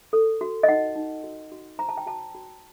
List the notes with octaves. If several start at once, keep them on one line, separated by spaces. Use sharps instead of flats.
A4
F#4
D#5
D#4 F#5
D#4
F#4
F#4
C5 A#5
A5
G5
F#4 A5
F#4